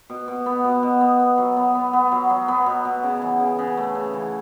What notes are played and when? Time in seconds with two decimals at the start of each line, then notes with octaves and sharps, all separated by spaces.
0.10 B2
0.28 B2
0.46 B3
0.64 B2
0.83 B2
1.01 B3
1.19 B3
1.38 F#3
1.56 B3
1.75 B3
1.93 B3
2.12 F#3
2.30 F#3
2.48 B3
2.66 B2
2.85 B2
3.03 C#3
3.22 E3
3.40 C#3
3.59 C#3
3.77 A3
3.95 C#3
4.14 E3